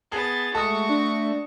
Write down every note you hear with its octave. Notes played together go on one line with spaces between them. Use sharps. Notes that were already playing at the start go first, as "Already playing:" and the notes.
B3 G#4 A5 A6
G#3 A3 F#4 A5 C#6 D#6
D4